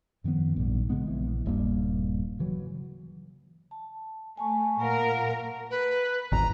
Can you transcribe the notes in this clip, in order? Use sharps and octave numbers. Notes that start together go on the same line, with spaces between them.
F#2 D#3 F3 B3
A#1 G#2 G3
C#3 E3 G#3 B3
A#1 E3
D#1 G2 G3 A#3
C#3 E3 F#3
A5
A3 G#5 A5 C#6
A#2 A#4 F5 F#5 A#5
B4
G#1 E2 A#5